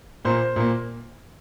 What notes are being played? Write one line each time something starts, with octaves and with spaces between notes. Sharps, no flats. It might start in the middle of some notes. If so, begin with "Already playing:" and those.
A#2 A#3 C5
A#2 A#3